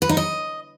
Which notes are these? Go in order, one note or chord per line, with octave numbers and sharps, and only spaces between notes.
B4
D#4
D#5